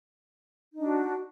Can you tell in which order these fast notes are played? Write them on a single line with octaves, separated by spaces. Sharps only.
D#4 D4 F#4